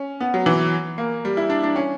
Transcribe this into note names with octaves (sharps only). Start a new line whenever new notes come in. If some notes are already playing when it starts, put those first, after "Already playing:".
Already playing: C#4
B3
F#3
E3
A#3
G3
E4
D4
D4
C#4